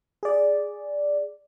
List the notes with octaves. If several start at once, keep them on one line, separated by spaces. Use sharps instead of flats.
G#4 D5